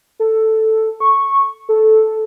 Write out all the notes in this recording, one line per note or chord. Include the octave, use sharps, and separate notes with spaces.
A4
C#6
A4